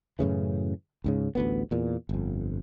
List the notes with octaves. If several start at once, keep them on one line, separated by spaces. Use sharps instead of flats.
F#2 A2 C#3 E3
C#2 G#2 C#3
A1 D2 B3
E2 A#2
G1 F2